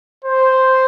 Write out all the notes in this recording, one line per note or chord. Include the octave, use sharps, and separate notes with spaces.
C5